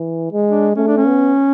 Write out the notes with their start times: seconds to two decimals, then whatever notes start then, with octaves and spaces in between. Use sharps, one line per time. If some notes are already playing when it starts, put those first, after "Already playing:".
Already playing: E3
0.32 G#3
0.48 D4
0.76 A3 C#4
0.87 D4
0.97 C#4
1.06 B3